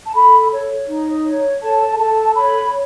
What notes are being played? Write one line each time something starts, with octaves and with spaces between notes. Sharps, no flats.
A5
A4 B5
C#5
D#4
C#5
A4 A5
A4 A5
C#5 B5